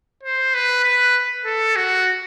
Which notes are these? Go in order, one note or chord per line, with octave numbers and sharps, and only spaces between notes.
C5
B4
B4
A4
F#4